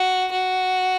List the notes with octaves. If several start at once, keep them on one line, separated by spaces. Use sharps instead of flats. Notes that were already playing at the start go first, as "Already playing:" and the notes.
Already playing: F#4
F#4